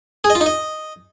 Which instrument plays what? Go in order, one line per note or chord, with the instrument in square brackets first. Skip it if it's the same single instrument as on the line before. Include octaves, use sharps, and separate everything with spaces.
[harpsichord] G#4
D#5
F4
D#4
D#5